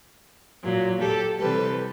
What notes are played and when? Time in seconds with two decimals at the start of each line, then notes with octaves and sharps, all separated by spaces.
0.63 A#2 F#3
1.01 G4 A4
1.39 C3 E3 G3 A4 B4